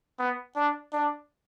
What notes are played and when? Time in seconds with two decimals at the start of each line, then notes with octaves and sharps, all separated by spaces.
0.19 B3
0.56 D4
0.93 D4